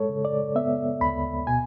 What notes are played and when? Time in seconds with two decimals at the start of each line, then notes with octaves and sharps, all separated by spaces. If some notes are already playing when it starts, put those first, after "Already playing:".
Already playing: G#3 A4 C#5
0.10 C#3
0.25 D5
0.56 B3 E5
1.01 D2 B5
1.47 B2 G#5